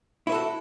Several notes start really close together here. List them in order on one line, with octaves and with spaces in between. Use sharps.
E4 B4 A4 F#4